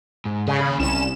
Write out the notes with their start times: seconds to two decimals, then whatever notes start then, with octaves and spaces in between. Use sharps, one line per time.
0.25 G#2
0.48 C#3 G#4 C#5
0.61 D#2 B5
0.79 C2 C#4 E7